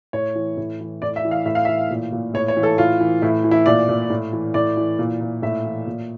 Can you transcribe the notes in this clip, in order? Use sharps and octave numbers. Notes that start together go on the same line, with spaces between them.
A2 C#5
E3
A2
E3
A2 D5
E5
E3
F5
A2 E5
F5
E3 E5
A#2
A#2
A2 C#5
C#5
E3
A4
A2 F4
E3
A2 E4
E3
E4
A#2 D5
A#2
A2
E3
A2 D5
E3
A#2
A#2
A2 E5
E3
A#2